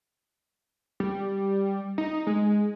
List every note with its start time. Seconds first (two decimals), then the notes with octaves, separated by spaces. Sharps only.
1.00 G3
1.98 D#4
2.27 G#3